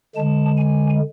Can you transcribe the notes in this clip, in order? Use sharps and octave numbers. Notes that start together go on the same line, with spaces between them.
D3 G#3 A5
G#5